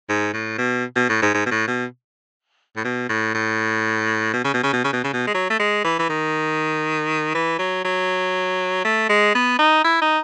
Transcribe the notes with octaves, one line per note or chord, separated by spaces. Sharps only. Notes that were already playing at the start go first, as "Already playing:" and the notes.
G#2
A2
B2
B2
A2
G#2
G#2
B2
A2
B2
A2
B2
A2
A2
B2
C#3
B2
C#3
B2
C#3
B2
C#3
B2
G#3
F#3
A3
G#3
E3
E3
D#3
E3
F#3
F#3
A3
G#3
B3
D#4
E4
D#4